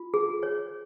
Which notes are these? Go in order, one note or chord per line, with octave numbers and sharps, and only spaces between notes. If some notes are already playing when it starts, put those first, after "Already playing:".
Already playing: F4
G#4
C#5